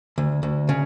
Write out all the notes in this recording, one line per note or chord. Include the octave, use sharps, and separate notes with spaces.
D2
D2
C#3